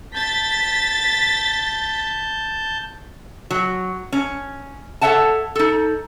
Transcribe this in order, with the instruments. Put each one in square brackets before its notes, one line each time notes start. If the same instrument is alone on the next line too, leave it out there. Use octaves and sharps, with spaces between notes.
[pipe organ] A5 G6 [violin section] A6 B6
[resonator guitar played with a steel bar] F#3
C#4
A4 C#5 E5 F#5 A5
D#4 A4